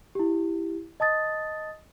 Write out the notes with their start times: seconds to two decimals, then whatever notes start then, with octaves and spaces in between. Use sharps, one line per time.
0.15 E4 G4
1.00 D#5 A5 D#6 A6